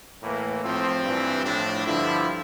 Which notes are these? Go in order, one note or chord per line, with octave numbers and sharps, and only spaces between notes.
A2 E3 A#3
A2 F3 C4
G2 E3
A2 F3 D4
G2 D3 F3 E4